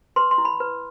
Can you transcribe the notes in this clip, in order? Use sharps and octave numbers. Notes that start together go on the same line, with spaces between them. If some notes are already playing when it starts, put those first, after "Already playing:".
B4 C6
C6
E4
B5
B4